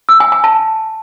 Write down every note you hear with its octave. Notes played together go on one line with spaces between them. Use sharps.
E6
G#5
G#5
A5